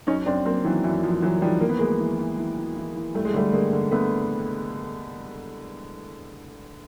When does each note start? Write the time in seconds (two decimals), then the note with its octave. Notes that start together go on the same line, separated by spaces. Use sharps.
0.07 F#2 C#4 D#4
0.26 F#2 C4 D4
0.46 F#2 A#3 C4
0.65 D#3 E3 F#3
0.84 F#2 E3
1.03 F#2 F3
1.22 F#2 E3 F#3
1.42 D#3 F3 G3
1.61 E3 A#3
1.69 B3
1.79 D2 G#3 A#3
1.99 E3
2.19 E3
2.38 E3
2.57 E3
2.77 E3
2.96 E3
3.15 G2 A3
3.25 G#3
3.34 D3 G3 A3
3.53 D3 G#3 A#3
3.73 D3
3.91 D3 A3 B3